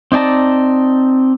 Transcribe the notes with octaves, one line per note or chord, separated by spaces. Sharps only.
C4 D#4 D5 A5 A#5